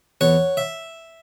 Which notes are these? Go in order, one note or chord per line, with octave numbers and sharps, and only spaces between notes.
E2 C#5 F#5
E5